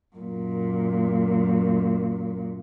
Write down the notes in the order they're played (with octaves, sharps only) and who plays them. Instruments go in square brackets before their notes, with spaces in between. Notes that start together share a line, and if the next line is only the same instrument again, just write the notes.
[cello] F#2 A#2